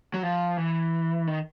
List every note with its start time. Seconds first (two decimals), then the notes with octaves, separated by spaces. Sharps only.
0.14 F#3
0.23 F3
0.57 E3
1.27 D#3